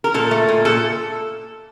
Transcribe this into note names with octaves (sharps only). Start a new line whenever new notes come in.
A#4
A#2 A4
A3
A#2
A#2 A4